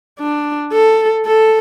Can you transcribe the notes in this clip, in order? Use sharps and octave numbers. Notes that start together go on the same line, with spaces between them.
D4
A4
A4